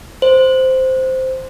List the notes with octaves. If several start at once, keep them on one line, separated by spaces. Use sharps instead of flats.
C5